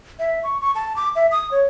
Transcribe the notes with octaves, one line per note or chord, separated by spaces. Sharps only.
E5
C#6
C#6
A5
D6
E5
D#6
C#5